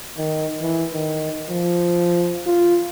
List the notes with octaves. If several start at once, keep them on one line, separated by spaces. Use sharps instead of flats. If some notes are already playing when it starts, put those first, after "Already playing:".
D#3
E3
D#3
F3
F4